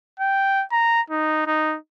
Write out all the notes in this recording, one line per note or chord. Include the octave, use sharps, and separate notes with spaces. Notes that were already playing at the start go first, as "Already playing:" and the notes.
G5
A#5
D#4
D#4